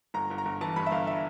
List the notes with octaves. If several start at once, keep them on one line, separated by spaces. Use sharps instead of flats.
G1 A#5
G1
A#5
G1
E3 A5
G2 B5
E5
G1 F5
E5